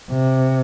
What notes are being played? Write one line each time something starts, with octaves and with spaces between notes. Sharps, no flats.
C3